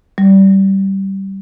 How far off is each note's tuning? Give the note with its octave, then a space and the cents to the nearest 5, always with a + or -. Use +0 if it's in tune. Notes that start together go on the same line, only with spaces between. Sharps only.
G3 -15